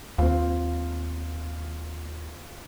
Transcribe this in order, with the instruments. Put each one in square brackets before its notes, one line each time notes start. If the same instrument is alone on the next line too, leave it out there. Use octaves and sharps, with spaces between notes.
[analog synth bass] D#2 [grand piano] C4 F4